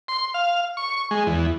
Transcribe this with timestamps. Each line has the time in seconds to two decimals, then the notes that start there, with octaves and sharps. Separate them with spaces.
0.08 C6
0.34 F5
0.77 C#6
1.11 G#3
1.27 E2